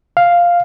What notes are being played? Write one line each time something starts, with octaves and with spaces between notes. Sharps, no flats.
F5